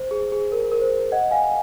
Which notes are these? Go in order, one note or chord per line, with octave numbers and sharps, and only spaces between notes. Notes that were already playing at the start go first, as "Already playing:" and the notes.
Already playing: C5
G#4
G#4
A#4
A#4
C5
D#5 F#5
F5 G#5